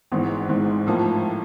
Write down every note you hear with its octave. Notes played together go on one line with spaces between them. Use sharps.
G#1 G#2 E3
G#1 G#2 E3
A2 F3 A#3